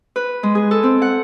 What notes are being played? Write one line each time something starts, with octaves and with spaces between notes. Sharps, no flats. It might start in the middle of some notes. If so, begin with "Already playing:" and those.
B4
G#3
G#4
A4
C4
F#5